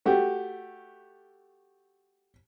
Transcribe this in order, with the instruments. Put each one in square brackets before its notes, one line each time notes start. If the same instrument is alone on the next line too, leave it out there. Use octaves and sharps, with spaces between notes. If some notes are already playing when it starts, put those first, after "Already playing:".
[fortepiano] A3 F#4 G4